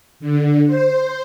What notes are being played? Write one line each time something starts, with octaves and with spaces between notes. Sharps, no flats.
D3
C5